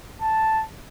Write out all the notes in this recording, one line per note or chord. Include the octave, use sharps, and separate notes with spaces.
A5